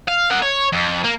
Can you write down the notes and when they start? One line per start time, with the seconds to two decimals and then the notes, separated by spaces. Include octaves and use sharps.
0.08 F5
0.31 A#4 F#5
0.42 C#5
0.73 F2
1.04 A#3